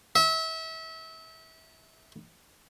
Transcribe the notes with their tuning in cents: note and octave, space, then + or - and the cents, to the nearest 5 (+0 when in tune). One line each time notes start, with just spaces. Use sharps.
E5 -30